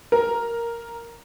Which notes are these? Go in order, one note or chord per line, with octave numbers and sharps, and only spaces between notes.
A#4